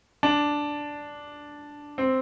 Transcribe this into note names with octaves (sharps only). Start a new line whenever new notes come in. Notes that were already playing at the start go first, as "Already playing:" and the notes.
D4
C4